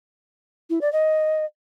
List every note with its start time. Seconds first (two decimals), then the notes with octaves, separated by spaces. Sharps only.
0.70 E4
0.81 D5
0.92 D#5